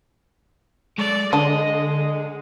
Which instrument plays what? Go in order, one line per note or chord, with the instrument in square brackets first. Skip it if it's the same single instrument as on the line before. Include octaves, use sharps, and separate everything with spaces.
[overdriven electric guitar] G#3 A4 [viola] D5
[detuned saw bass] D3 [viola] G#3 [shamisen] D4 A4 [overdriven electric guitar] D#5